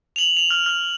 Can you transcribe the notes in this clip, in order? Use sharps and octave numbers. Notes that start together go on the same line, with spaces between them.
F7 F#7
F7
F6
F6